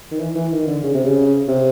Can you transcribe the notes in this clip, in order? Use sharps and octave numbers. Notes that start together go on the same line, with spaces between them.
D#3
E3
E3
D#3
D3
C#3
C3
C#3
C3